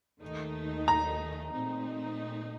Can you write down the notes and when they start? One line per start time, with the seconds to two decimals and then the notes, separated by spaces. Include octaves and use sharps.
0.22 D#2 D#3 A3 D#4
0.88 A#5
1.53 A#2 A3 C4 D#4